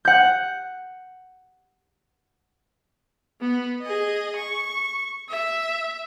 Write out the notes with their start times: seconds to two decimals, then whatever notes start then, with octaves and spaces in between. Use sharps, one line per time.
0.05 F#5 G6
3.41 B3
3.82 G#4 D#5
4.36 C#6
5.29 E5